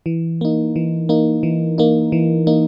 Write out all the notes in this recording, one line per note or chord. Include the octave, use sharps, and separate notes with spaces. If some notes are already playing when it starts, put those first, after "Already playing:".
E3
A#3 D#4
E3
A#3 D#4
E3
A#3 D#4
E3
A#3 D#4